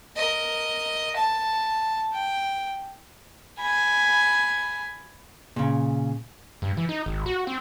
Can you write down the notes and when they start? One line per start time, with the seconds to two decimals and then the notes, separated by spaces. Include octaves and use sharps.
0.16 A#4 D#5
1.16 A5
2.12 G5
3.60 G#5 B5
5.56 A#2 C#3
6.62 G2
6.77 E3
6.89 D#4
7.06 G#1
7.26 F#4
7.47 C4